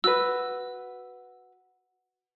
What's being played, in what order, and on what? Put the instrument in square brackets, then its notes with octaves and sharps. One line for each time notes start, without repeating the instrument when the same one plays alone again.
[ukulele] F#4 B4 [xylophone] E6